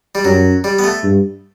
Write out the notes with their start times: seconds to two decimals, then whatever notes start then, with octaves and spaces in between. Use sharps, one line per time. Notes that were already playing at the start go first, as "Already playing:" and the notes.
0.15 G3
0.25 F#2 F#3
0.64 G3
0.79 B3
0.84 A3
1.04 G2